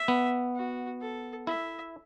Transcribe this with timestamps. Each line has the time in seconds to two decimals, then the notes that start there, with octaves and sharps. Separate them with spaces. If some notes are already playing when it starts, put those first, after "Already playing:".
Already playing: E5
0.08 B3
0.55 F#4
1.01 A4
1.47 E4 E5